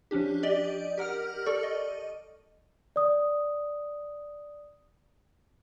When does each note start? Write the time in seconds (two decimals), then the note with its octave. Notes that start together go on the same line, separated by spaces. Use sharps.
0.11 F3 C#4 D4 G4
0.43 G4 D5 D#5
0.98 G4 A#4 F#5 F6
1.46 A4 D5 C#6
1.63 D#5
2.96 D5 D#6